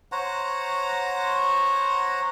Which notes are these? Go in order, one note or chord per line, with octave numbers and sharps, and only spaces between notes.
C5 C#5 F#5 A#5